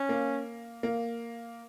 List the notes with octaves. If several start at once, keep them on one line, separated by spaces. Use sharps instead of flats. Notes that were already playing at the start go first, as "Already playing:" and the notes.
Already playing: C#4
A#3
A#3